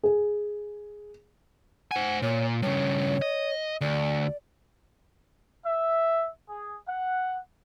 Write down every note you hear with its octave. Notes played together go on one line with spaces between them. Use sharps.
G#4
C5 F#5 G#5
A#2 C#5
G2 C#3 C#5
D#5
D2 D5
E5
G#4
F#5